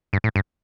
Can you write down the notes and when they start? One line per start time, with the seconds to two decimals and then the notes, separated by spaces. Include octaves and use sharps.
0.13 G2
0.24 A2
0.36 G2